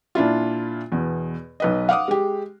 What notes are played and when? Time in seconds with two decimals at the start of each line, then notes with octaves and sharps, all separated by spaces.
0.15 A#2 D4 E4 F4
0.92 E2 B2
1.60 B1 B4 D#5
1.89 F5 F#5 D6 D#6
2.08 G#3 G4